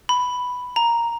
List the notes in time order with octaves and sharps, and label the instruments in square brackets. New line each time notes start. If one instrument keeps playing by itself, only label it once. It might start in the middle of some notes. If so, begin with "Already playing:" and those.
[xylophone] B5
A#5